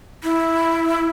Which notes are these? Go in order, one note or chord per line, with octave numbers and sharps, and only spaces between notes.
E4